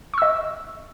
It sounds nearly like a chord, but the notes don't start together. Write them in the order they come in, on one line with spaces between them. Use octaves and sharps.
C#6 E6 D#5